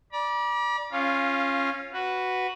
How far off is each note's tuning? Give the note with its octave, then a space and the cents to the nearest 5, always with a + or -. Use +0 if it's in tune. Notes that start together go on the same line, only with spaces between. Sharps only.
D5 +0 B5 -45
C#4 -20 F4 -15 F5 +0
F#4 +0 B4 +0